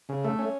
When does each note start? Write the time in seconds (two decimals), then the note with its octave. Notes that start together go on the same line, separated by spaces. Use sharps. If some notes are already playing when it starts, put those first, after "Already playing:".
0.09 C#3
0.24 A3
0.39 C#4